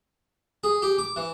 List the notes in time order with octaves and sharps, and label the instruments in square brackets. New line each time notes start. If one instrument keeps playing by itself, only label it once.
[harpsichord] G#4
G4
D6
E3